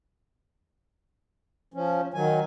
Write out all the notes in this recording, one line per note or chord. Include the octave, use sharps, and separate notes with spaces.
F3 C#4
D#3 F#3 G#5